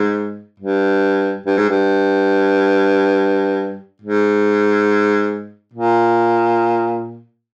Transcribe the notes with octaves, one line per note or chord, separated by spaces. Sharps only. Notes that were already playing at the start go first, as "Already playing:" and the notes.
Already playing: G#2
G2
G2
G#2
G2
G#2
A#2